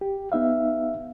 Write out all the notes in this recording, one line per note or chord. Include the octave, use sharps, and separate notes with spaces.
G4
B3 D#4 E5 F5